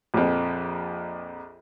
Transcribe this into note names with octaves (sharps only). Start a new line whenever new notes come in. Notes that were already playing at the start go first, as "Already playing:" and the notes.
A#1 F2